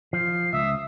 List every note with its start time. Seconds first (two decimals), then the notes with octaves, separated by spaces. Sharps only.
0.13 F3 C7
0.53 C#2 E5 D#6